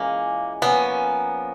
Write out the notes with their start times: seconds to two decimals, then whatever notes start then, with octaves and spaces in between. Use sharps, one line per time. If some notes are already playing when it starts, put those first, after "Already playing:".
Already playing: E3 G#3 A#3 C#4 F4
0.62 F3 A#3 B3 C#4